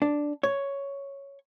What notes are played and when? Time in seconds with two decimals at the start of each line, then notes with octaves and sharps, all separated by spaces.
0.02 D4
0.43 C#5